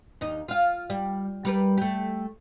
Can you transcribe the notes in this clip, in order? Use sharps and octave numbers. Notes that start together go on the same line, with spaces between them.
D#2 D#4
F4 F5
G3
G3 A#4 B4
A3 G4